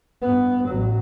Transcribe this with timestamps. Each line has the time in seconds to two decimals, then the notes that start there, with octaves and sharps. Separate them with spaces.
0.22 G2 B3
0.69 A1 F#3